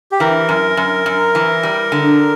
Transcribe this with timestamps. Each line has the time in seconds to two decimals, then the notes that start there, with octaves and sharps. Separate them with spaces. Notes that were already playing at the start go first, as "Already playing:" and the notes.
0.11 G4
0.20 E3 A#4
0.49 F#2
0.77 F#2
1.06 F#2
1.35 E3
1.63 G3
1.92 D3